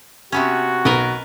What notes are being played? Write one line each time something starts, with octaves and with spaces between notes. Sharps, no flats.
C3 B3 C#4 F#4
B1 A#4 B4 D#5